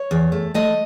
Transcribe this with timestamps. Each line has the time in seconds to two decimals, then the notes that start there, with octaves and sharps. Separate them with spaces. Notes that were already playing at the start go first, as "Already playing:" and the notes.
Already playing: C#5
0.11 E2
0.32 A3
0.54 A3 D#5